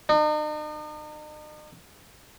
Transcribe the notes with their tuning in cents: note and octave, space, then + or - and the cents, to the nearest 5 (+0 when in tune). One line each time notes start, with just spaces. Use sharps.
D#4 -40